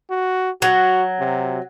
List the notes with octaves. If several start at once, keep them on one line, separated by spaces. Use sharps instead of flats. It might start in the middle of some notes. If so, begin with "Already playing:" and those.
F#4
F#3 F#4
C3